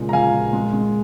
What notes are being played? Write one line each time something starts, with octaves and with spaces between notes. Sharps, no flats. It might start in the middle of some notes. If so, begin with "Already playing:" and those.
Already playing: A#2 C#3 G#3
A#5
F3 F5 G#5
A#2
G#3
G#3